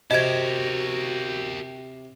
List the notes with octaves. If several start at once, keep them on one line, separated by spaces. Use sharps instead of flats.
C3 F#4 G4 A#4 D#5 G#6